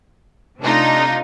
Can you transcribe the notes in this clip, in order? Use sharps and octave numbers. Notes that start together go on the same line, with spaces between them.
C3 A3 D4 D#4 F4